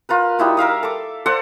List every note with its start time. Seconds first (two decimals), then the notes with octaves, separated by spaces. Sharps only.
0.09 F4 A#4 B4
0.39 G3 D#4 E4 F#4
0.57 A#4 E5 F5 D#6
0.83 A4 D6
1.26 A4 C5 D5 F#5